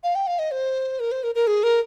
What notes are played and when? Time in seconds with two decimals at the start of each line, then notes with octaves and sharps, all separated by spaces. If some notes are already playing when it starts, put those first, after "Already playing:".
0.03 F5
0.15 G5
0.27 F5
0.39 D#5
0.51 C5
1.00 A#4
1.12 C5
1.23 A#4
1.35 A#4
1.47 G#4
1.63 A#4